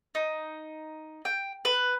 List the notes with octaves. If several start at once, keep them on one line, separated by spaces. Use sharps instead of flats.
D#4
G5
B4